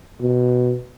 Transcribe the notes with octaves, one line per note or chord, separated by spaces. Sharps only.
B2